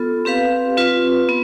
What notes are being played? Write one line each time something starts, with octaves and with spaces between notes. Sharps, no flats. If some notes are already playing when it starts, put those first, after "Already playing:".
Already playing: B3 F4 A4
C4 G4 B4 F5
C4 F4 B4
B3